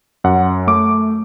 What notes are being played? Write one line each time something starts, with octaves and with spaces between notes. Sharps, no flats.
F#2 F#5
A3 D6